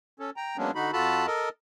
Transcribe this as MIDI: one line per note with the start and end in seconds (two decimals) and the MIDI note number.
0.19 0.30 61
0.19 0.30 69
0.37 0.57 79
0.37 0.57 82
0.57 0.71 54
0.57 0.71 56
0.57 0.71 58
0.57 0.71 59
0.57 0.71 61
0.57 0.71 62
0.75 0.91 50
0.75 0.91 63
0.75 0.91 66
0.75 0.91 83
0.93 1.26 41
0.93 1.26 65
0.93 1.26 66
0.93 1.26 69
0.93 1.26 81
0.93 1.26 83
1.27 1.49 69
1.27 1.49 70
1.27 1.49 75